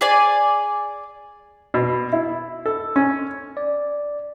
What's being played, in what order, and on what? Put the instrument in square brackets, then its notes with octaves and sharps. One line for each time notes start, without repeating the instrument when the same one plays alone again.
[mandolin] G#4 D5 G#5
[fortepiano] B2
E4
A4
C#4
[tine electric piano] D5